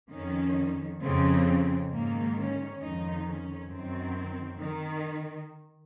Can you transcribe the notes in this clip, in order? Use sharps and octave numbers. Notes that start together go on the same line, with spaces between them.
F2 D#3 C#4
F2 C#3 C4
G#2 D#3 A#3
C#4
F2 D#3 D#4
C#4
F#2 D#3 C4
D#3